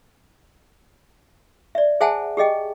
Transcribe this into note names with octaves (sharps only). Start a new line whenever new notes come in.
D5 E5
G#4 C5 E5 F#5 G#5 A5
G4 G#4 D#5 G5